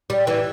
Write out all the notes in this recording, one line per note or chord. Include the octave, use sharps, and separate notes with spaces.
G3
E3